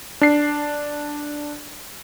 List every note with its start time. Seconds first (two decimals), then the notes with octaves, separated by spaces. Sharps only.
0.21 D4 C7